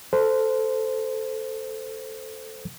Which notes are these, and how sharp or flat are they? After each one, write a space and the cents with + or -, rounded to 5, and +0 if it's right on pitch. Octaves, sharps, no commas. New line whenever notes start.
A4 +0 C5 -15